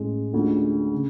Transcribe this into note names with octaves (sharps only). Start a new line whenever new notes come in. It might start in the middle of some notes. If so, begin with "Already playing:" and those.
Already playing: A1 A2 G#3 C#4
D2 D3 G#3 C#4 F4
C#3